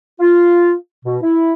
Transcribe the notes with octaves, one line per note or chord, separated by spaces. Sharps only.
F4
B2
E4